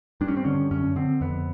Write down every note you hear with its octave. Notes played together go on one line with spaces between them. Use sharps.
G2 D4
C#4
C4
D3 C#4
F#2 C#4
D3 C4
F2 B3